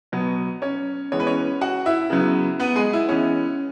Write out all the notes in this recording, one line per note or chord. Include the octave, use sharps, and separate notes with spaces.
B2 F#3 B3
C#4 C#5
E3 G#3 B3 C#5
B4
C#4 C#5
F#4 F#5
E4 E5
C#3 F#3 B3
B3 B4
G#3 G#4
E4
E3 G#3 B3 C#4